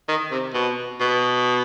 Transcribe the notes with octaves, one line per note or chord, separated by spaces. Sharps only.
D#3
C3
B2
B2